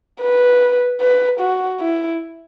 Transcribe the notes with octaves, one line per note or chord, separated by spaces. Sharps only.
B4
B4
F#4
E4